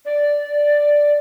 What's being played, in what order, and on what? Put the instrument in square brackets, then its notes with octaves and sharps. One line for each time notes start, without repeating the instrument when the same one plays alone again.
[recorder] D5